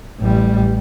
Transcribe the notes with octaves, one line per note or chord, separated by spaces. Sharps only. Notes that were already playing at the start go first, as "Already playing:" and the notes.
A1 G3